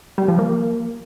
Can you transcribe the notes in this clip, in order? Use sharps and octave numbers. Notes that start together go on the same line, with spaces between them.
G3
F3
A#3